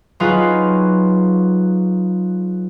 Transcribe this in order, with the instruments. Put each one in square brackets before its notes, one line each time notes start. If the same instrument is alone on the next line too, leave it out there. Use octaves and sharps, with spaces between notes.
[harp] F#3 D#4 F4 G#4 B4 F5